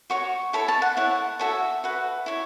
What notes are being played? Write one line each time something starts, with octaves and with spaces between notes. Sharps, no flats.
F#4 C#5 C#6
E4 A4 C#5 B5
A5
F#5
E4 C#5 F#5
F#4 A4 C#5 E5
F#4 B4
E4 C#5